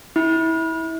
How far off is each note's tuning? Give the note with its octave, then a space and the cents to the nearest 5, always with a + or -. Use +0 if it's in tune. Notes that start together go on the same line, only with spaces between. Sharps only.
E4 -25